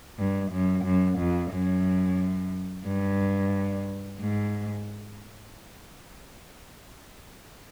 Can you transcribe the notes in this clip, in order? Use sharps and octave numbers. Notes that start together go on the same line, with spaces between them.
G2
F#2
F#2
F2
F#2
G2
G#2